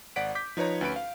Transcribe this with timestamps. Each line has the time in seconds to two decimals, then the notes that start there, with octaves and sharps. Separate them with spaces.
0.16 G#1 D5 F#5 B6 D7
0.35 D6 G6 B6
0.57 F3 D#4 B4 C#5 A#5
0.81 D2 C#4 B4 B5 D7
0.96 F5